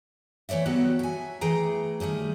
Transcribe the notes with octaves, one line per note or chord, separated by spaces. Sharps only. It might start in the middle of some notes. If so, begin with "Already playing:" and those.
E3 A3 C#5 D5 E5
F#3 B3 F#4 G4 A4 C#5
E5 G#5
E3 A3 G#4 G5 A#5
D#3 G3 A3 G#4